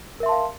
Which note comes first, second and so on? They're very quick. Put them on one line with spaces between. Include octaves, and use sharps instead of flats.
A#4 E5 C6 A5 F5